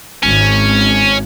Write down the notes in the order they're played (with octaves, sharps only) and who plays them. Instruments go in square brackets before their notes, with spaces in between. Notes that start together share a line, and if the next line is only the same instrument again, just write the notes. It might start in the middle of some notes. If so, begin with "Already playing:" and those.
[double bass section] G#1 [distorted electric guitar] C#4